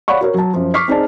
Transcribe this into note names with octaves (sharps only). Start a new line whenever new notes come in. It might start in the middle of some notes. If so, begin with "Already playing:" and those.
C#5 D5 F5 F#5 B5 C#6
F#4 A#4 C#5
F#3 A5
F#2 F3
C#6 D6 F6 B6 C7
C4 D#4 G#4 D5 A5